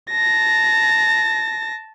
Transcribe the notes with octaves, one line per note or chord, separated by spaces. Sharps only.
A5 A#6